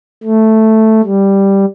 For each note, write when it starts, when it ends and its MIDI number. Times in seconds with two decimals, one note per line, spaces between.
0.23 1.01 57
1.04 1.65 55